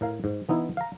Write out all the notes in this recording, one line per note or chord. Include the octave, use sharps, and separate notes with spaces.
A2 A#4 F5
G#2
E3 B3 D#4 E4
F5 A#5